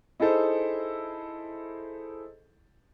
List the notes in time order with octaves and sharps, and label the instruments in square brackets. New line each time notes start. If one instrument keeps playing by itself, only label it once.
[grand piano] D#4 E4 G#4 A4 C5